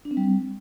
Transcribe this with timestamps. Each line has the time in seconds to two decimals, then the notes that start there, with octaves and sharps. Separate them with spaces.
0.05 D4
0.11 C4
0.17 G3